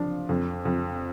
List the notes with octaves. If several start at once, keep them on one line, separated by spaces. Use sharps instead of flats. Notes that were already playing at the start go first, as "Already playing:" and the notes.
Already playing: F3 D4
F2
F2